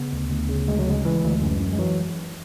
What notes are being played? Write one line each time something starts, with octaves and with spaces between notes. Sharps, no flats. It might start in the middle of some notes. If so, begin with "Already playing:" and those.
Already playing: C#3 B3
D2
D2
C#3
D2 G#3
F#3
C#3 G#3
E3
D2
F#2
F#2
G#3
E3 F#3